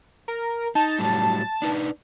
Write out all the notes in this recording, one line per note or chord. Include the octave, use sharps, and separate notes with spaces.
A#4
D#4 A5
A2 F#3 G3
D4 D#4 B4